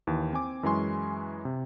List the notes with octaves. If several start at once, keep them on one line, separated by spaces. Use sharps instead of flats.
D#2 E3
C4 G#5 D6
F#2 E3 G#3 G#5 C6 C#6
C3